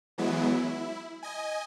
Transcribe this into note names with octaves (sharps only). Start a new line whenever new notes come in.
E3 F#3 G#3 B3 E4
E4
D#5 G#5